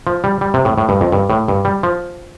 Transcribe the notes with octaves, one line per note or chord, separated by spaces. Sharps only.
F3
G3
G3
C3
A2
A2
G2
F2
G2
A2
G2
G3
F3